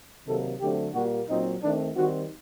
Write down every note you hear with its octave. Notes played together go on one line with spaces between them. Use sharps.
C3 D#3 F#3 A#3 A4
D3 F#3 A3 C4 G4
A#2 G3 A#3 F#4
A#2 F#3 C4 D#4
D#3 A3 C4 D4
D#3 G3 C4 F#4